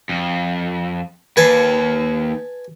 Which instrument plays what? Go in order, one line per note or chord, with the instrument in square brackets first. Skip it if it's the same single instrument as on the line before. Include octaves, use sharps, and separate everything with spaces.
[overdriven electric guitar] F2
[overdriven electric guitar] D#2 [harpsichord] B4 G#5 A5